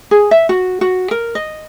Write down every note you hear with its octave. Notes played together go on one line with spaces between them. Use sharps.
G#4
E5
F#4
F#4
A#4
D#5